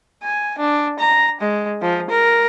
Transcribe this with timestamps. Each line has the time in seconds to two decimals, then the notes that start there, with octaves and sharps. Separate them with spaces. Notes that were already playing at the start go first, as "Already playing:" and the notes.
0.23 G#5
0.58 D4
0.99 A#5
1.41 G#3
1.82 F3
2.10 A#4